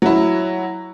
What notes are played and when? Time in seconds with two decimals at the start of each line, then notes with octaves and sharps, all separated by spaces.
0.02 F#3 E4